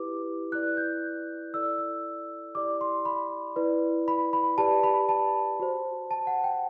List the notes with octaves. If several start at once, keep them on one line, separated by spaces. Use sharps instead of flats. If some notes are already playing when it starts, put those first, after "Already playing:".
Already playing: E4 G4 B4 D6
E4 B4 D5 F#6
G6
E4 A4 D5 E6
E6
E4 G4 D5 D6
C6
B5
E4 B4 D5
B5
B5
G4 B4 D5 A5
B5
A5
F#4 C5
A5
F#5
G5